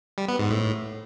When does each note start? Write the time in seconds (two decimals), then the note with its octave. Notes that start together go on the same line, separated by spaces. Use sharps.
0.18 G3
0.29 B3
0.39 G#2
0.50 A2